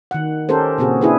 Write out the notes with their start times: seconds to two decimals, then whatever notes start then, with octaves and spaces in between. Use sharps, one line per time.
0.11 D#3 F#5
0.49 C#4 G4 A4 A#4 C5
0.78 A#2 C#3 C4 F#4 G#4
1.01 D4 E4 G#4 B4